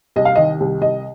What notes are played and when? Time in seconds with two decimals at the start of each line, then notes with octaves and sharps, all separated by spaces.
0.16 C2 D#5
0.25 F5
0.35 D#3 D#5
0.60 C2
0.81 C2 D#5